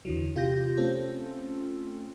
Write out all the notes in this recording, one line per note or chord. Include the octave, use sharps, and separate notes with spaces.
E2 D3 E3 F#3
C3 F4 G4 G6 A#6
A3 C4 C#4 F4 A4